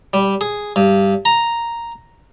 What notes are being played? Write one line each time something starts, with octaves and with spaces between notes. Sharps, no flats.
G3
G#4
G2
A#5